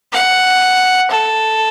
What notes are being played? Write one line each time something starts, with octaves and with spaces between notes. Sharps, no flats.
F#5
A4